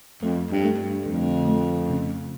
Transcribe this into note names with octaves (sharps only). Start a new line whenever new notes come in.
F2 A3
G2
A3
G2
F2 D3
A3
C#3